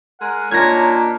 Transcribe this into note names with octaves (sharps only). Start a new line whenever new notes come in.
G#3 A#4 F#5
A#2 D4 D#4 C#5 G#6 A#6